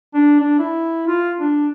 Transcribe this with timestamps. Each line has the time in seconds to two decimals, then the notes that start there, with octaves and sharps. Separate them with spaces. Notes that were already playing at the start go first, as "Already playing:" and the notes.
0.14 D4
0.40 D4
0.59 E4
1.07 F4
1.40 D4